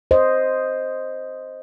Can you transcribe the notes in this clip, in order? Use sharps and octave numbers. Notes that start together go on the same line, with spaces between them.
C5 D#5